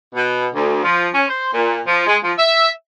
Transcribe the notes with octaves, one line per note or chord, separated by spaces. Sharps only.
B2
D2
F3
C#4
C5
A#2
F3
G#3
F3
E5